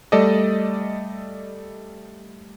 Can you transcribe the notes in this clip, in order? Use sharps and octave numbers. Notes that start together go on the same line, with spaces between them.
G3 A3 A4 D5 D#5